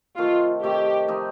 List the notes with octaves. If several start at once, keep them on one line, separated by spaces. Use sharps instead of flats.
C3 D#3 A3 F4
C3 D#3 A3 G4
F3 A3 D#4 G4